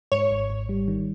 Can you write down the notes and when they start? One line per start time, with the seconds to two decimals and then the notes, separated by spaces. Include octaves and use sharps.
0.12 G#2 C#5
0.31 G#1
0.50 G#1
0.69 G3
0.88 D#3